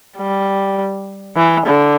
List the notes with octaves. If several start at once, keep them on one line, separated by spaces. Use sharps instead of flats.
G3
E3
D3